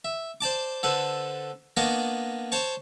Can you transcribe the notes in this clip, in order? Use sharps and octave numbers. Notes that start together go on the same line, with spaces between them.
E5
C5 D5 A5 D6
D3 A4 B4 C5
A#3 B3 D4 D5 D#5 C#6
C5 C#5 A5 C#6